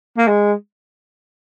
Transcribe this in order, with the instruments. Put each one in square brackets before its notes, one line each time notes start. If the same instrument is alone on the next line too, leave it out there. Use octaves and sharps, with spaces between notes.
[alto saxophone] A#3
G#3